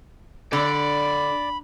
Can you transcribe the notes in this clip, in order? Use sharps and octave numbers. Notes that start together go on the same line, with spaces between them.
D3 D5 B5